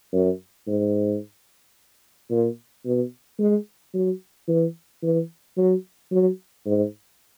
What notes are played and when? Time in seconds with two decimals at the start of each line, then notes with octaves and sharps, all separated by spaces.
0.13 F#2
0.68 G#2
2.31 A#2
2.85 B2
3.39 G#3
3.94 F#3
4.48 E3
5.03 E3
5.57 F#3
6.11 F#3
6.66 G#2